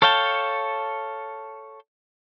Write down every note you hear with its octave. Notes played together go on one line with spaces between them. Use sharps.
A4 C#5 F5 G5 A5